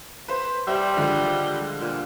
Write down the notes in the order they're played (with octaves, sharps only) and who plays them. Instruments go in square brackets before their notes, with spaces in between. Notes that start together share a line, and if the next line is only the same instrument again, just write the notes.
[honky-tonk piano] B4 C5
[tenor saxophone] G3 [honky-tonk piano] C5 E5
[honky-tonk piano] D3 F3 G#3
[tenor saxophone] A#2